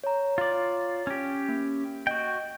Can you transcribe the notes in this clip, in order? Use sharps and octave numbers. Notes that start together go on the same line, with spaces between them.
C#5 A#5
F4 D5
C#4 G4
A#3
F#4 D#5 G5